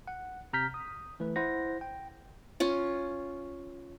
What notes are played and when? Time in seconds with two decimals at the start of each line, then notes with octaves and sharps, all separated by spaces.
0.07 F#5
0.53 C3 A#5 F6 G6 B6
0.74 D#6
1.19 B1 E3 A3 B4
1.36 E4 C5 F#5 A#6
1.81 G5
2.60 C#4 F4